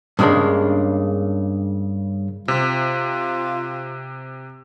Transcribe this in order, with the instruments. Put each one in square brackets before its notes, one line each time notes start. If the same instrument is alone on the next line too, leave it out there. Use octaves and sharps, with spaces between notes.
[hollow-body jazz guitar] G2 C#3 G#3 A#3 D4
[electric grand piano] C3 [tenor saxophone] F4